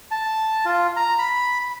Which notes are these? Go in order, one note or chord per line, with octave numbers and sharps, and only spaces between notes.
A5
F4
A#5
B5